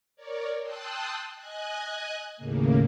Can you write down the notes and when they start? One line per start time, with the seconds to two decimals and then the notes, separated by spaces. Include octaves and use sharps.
0.16 A#4 C#5 D5
0.62 G5 A5 C6 D#6 E6 F#6
1.35 D#5 G#5 F#6 G#6
2.37 D#2 A2 C#3 A#3